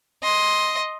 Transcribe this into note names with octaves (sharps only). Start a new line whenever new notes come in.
D#5 C6